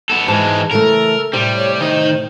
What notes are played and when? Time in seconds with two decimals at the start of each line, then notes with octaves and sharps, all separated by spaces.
0.10 B3 A4
0.28 G#2 E3 G#3 A5
0.71 C#3 E3 A3 A4 A#4
1.33 A2 C3 G3
1.57 C#5
1.81 D#3 C5 D#5